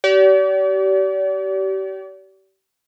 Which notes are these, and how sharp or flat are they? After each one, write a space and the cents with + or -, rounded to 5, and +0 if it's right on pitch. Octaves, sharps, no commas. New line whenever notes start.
G4 -35 D5 -40